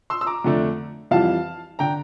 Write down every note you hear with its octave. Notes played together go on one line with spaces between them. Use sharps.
C6 E6
E6
A#5 D6
F2 D3 A3 D4
F2 E3 G3 F5 A5
D3 G5 A#5